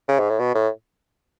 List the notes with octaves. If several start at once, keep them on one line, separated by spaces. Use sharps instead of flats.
C#3
G#2
A2
B2
A2